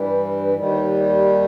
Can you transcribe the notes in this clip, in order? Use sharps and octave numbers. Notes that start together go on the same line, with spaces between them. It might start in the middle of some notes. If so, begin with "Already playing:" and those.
Already playing: G2 E3 G3
D#2 D#3 G3